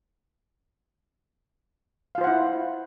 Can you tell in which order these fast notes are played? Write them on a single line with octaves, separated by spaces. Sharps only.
F5 F4 C5 F#5 E4